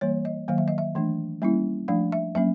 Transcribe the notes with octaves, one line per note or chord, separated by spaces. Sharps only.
E3 G3 A#3 C#5
D#5
D#3 F#3 A#3 F5
E5
D#5
E5
E3 A3 D4
G3 A#3 C#4 E4
F3 A3 D4 F5
E5
F#3 A#3 C#4 E5